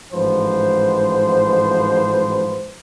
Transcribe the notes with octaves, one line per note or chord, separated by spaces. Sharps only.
A1 G#2 F3 B4 C5